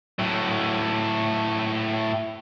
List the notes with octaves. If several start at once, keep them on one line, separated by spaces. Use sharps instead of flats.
A2 F#3